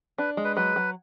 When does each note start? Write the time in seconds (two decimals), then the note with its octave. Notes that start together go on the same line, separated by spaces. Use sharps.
0.18 D4 B4
0.37 G#3
0.45 B4
0.56 F#3 B4
0.76 F#3